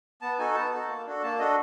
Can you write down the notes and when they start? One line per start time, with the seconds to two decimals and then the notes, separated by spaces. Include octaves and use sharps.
0.22 B3 A5
0.39 D#4 F#4 A4 G#5
0.55 B3 A5
0.72 D#4 F#4 A4
0.89 A#3
1.06 D4 F#4 A4
1.23 A#3 A5
1.39 D4 F#4 A4 D#5